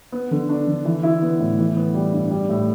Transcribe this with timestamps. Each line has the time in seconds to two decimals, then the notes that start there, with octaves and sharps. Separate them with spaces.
0.12 B3
0.31 D3
0.49 D4
0.67 D3
0.85 E3
1.03 E4
1.22 B3
1.40 A2
1.59 E3
1.77 B3
1.94 G3
2.12 G2
2.30 G3
2.49 A2